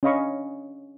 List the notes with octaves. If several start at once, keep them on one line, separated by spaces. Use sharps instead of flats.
C#4 D4 D#5 F5 B5 C#6